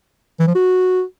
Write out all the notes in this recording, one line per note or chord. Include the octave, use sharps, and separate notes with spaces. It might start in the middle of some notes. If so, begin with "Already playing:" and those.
E3
F3
F#4